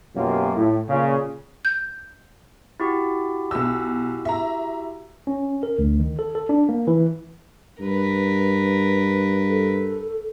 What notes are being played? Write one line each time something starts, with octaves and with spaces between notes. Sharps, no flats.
F#2 B2 F#3 A#3 F4 G4
A2
A#2 C#3
G6
E4 F#4 G4
B1 E6
E5 A#5
C#4
A#4
D2
D#3
A4
A4
D4
A#3
E3
G2 A#4 B4
A4